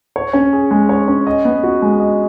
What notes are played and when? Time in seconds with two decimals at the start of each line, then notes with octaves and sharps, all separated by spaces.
0.16 C#5
0.33 C#4
0.53 G#4
0.71 G#3
0.89 C#5
1.08 C#4
1.27 D#5
1.45 B3
1.63 F#4
1.82 G#3
2.00 D#5